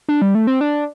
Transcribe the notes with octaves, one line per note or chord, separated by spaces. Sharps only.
D4
G3
A3
C4
D4